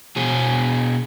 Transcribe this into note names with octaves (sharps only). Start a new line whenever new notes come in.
B2 G#4